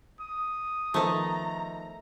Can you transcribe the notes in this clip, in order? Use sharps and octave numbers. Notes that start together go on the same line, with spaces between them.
D#6
D#3 F3 A3 B3 A4 A#5